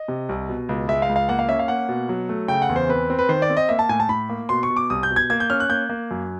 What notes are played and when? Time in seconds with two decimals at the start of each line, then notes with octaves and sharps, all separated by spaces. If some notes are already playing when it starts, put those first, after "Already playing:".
Already playing: D#5
0.08 C3
0.29 C2
0.49 B2
0.69 C#2
0.88 G#3 E5
1.02 F5
1.09 C#2
1.16 F5
1.29 A#3 F#5
1.39 F5
1.48 C#4 E5
1.59 F5
1.68 A#3 F#5
1.89 B2
2.09 F#3
2.29 A3
2.48 C#3 G5
2.62 F#5
2.69 E2
2.76 C5
2.89 C4 B4
3.10 C4
3.19 B4
3.29 D#3 C5
3.42 D5
3.50 C4
3.57 D#5
3.69 A#3 E5
3.79 A5
3.89 A2 G#5
4.00 A5
4.09 A2 B5
4.29 A#3
4.49 B2 C6
4.63 C#6
4.70 B2
4.76 D6
4.90 C2 D#6
5.03 G6
5.10 B2
5.16 G#6
5.30 A#3 G#6
5.40 G6
5.50 C#4 F6
5.60 F#6
5.69 A#3 G6
5.89 A#3
6.11 F#2